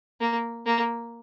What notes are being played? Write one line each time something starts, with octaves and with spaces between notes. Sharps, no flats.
A#3
A#3